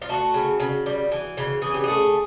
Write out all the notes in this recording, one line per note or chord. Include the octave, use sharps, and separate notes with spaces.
F4
A3 F#4
C#3
C#3
G3
E3
C#3
E3 G#4
G4
A3 G#4